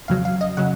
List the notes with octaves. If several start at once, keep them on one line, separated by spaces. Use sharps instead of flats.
F2 C#3 F#3 F5
F5
D#5
C#3 F#3 F#5